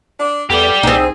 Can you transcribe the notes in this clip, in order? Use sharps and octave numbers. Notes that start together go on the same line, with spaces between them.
D4
E2 B3 G4 A4 D5
C2 C4 D#4 G#4